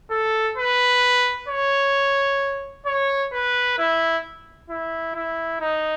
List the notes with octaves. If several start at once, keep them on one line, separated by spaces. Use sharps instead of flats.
A4
B4
C#5
C#5
B4
E4
E4
E4
D#4